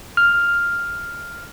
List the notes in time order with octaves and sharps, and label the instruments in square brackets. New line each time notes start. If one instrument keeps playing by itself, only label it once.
[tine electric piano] F6